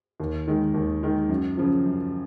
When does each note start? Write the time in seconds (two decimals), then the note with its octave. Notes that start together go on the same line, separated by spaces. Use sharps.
0.20 D#2
0.47 D#3 G#3
0.74 D#2
1.03 D#3 G#3
1.29 F#2
1.57 C#3 F3
1.86 F#2